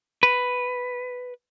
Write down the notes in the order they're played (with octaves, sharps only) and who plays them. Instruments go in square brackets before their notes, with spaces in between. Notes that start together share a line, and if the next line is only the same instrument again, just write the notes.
[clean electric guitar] B4